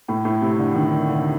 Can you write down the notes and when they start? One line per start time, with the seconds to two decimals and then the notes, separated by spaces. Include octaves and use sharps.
0.08 A2
0.25 A2
0.42 C3
0.58 D3
0.75 D#3
1.08 D3